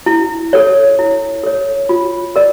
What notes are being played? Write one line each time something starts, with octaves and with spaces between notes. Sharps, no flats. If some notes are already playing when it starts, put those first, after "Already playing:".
E4
A4 C#5
E4
A4 C#5
F4
A#4 D5